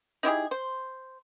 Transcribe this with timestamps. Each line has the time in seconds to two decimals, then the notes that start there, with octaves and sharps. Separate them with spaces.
0.23 D#4 E4 G4 G#4
0.51 C5